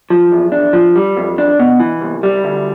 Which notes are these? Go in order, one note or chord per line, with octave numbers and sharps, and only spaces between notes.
F3
E2
D4
F3
G3
F2
D4
B2
E3
C2
G3
D2